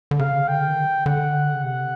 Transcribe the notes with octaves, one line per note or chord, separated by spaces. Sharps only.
D3
C#3 F5
D3 G5
D#3
D3 F#5
C#3
C3 F#5